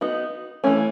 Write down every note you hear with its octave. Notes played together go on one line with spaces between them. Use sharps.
B3 D#4 F#4
E3 A3 C#4